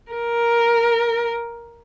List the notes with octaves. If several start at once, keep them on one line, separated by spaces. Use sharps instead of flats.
A#4